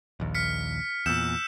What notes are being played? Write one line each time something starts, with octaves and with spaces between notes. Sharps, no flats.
A#1 D#2
F6 B6 C#7
E2 A#2 E6 G6 E7